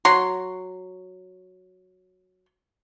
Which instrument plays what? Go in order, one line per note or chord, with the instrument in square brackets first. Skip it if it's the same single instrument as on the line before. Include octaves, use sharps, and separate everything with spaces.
[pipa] F#3 C6